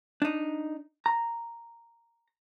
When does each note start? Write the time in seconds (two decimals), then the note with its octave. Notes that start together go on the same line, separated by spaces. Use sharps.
0.22 D4 D#4
1.06 A#5